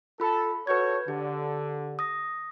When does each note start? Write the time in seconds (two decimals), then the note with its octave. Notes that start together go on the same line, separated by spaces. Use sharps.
0.20 F4 A4 B5
0.67 F#4 A4 B4 C#5 G6 G#6
1.08 D3 G4
1.99 D#6 A#6